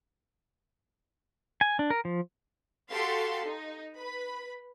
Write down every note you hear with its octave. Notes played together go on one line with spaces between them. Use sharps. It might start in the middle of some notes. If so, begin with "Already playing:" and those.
G#5
D4
A#4
F3
F#4 G4 A4 F5 C6
D#4
B4 B5